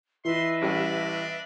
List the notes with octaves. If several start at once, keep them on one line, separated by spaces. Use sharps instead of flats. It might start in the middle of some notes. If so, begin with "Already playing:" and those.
E3 B4 D#5 E5 C6
A1 G3 D4